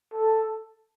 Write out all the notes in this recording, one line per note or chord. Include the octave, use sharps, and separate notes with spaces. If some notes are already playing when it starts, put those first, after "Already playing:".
A4